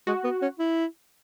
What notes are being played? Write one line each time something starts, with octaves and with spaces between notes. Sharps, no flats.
G#3 F#4
B3
C#4
E4